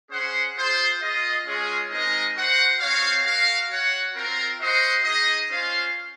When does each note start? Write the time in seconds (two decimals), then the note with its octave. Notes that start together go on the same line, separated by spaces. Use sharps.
0.11 C#4 G#4 C5 F#5
0.56 F4 G#4 C5
1.01 F4 G#4 D#5
1.46 G#3 C#4 F4 G#4
1.90 G#3 C4 D#4 A#4 D#5
2.35 F#4 C5 F#5
2.80 C4 F#4 C#5 F5
3.25 F#4 A#4 F5
3.69 F#4 C#5 F#5
4.14 C4 F4 A#4
4.59 F#4 C5 D#5 F#5
5.04 D#4 G#4 D#5
5.49 C#4 F4 C5 F5